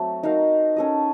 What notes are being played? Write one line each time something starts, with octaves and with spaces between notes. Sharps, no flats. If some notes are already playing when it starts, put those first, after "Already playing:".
Already playing: F#3 A3 C4
D#4 F#4 A#4 F5
C#4 A4 D#5